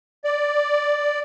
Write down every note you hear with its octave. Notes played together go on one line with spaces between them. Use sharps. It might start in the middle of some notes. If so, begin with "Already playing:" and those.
D5